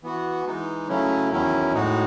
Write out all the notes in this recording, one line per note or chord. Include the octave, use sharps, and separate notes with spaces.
E3 B3 F#4
E3 G#3 D#4
C#3 F#3 A3 C#4 E4
E2 D#3 F#3 C#4 E4
A2 G#3 D#4 F#4